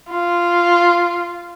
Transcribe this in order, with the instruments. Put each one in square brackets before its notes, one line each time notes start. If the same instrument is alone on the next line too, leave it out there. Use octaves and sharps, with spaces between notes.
[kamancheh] F4